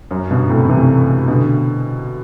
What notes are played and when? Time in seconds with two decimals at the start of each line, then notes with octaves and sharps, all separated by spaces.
0.11 F#2
0.31 G2 B2
0.50 A2 C3
0.69 C3 E3
1.28 B2 D3